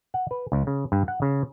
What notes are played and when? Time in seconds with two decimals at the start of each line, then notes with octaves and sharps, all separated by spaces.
0.14 F#5
0.31 B4
0.52 C#2
0.67 C#3
0.92 G2
1.08 F#5
1.22 C#3